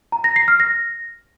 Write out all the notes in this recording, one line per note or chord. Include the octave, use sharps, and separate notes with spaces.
A#5
A#6
C7
F6
A#6